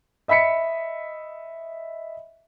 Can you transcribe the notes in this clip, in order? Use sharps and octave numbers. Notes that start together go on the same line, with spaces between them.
D#5 E5 B5 B6 C#7